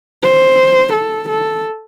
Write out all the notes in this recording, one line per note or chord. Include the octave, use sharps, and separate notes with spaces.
C5
A4
A4